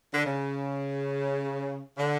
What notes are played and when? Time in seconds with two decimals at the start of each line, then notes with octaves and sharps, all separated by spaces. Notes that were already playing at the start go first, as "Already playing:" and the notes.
0.13 D3
0.25 C#3
1.98 D3